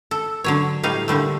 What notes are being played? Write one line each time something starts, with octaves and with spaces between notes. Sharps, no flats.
A4
D3 F#3 C#5
A2 G3 D#4 F5
A#2 D3 G3 A3